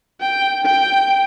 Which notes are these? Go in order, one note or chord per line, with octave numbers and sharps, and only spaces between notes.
G5
G5